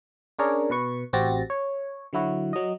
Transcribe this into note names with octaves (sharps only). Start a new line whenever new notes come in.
C#4 D4 G#4 A#4 C#5 D5
B2 B4 C#6
A1 C4 F#4 G4 A6 A#6
C#5
D3 F#3 E4 F#4
F#3 D#5